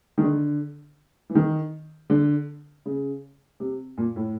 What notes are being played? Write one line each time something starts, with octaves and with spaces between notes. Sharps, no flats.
D#3
D3
E3
D#3
D3
C#3
C3
A#2
A2